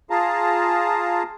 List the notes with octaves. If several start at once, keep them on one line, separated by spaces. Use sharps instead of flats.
F4 G#4 F5 A5 A#5